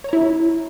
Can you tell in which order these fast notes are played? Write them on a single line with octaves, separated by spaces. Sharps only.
C#5 A#5 E4